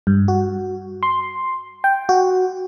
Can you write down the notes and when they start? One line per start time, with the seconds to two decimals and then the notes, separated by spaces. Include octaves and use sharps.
0.07 G2
0.28 F#4
1.03 C6
1.84 G5
2.09 F#4